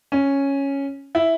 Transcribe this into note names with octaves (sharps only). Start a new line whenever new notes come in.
C#4
E4